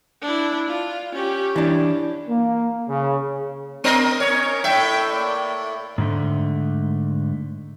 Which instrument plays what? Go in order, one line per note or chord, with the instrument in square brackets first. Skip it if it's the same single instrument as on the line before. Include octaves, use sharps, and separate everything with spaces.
[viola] D4 E4
F4
C#4 G4
[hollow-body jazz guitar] E3 D4
[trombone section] A#3
C#3
[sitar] B3 A#4 D#5 [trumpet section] C4
[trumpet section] C#4 D#4 A#4 [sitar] C#5
[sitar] A2 E5 [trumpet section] G5
[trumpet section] A#3 D5
[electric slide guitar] G#2 D3 A3